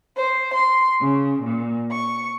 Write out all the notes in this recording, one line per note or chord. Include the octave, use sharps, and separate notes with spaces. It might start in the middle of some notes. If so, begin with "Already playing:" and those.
C5
C6
C#3
A#2
C#6